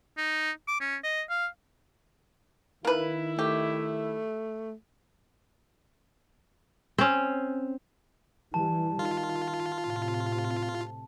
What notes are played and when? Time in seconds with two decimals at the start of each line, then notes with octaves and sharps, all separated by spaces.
0.17 D#4
0.68 D6
0.81 C#4
1.04 D#5
1.30 F5
2.85 D#3 A#3 E4 B4
3.39 A3 G4
6.98 C4 C#4
8.54 E3 G3 A5
8.99 D#3 F4
9.81 A2 C3